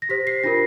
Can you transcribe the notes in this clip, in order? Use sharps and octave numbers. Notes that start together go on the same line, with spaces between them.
A#6
G4 C5 B6
C7
D4 F4 A#4 A#6